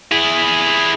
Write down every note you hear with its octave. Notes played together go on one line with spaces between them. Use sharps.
E4 G#4